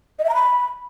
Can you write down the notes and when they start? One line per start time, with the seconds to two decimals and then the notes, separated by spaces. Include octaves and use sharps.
0.19 D#5
0.24 E5
0.29 A#5
0.34 B5